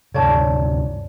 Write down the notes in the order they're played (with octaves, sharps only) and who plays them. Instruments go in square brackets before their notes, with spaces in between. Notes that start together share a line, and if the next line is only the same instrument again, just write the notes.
[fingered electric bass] D2 G2 C3 [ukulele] C#5 D5 A5